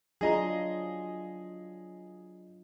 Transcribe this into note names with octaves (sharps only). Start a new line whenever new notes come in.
F#3 D4 F4 G#4 D#5 A#5